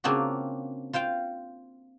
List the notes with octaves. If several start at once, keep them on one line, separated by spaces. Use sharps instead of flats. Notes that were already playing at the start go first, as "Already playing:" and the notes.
C#3 A#3 C4 D4 F4 F#4
F4 C5 F5 G5